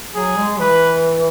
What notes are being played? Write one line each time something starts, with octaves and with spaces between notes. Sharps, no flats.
F#3 G#4
G#3
E3 B4